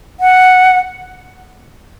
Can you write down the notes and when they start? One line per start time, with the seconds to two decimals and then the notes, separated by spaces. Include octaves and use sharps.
0.20 F#5